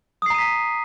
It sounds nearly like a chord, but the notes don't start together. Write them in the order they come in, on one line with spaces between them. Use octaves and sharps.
D#6 C7 A#5 D#7 B6